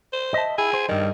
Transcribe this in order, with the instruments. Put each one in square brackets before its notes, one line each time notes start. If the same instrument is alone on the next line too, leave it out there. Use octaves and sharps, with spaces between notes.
[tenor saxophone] C5
[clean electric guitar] D#5 E5 A5
[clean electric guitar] E4 [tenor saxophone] G#4
[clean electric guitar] C5
[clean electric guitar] G2 G3 [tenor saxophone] D#3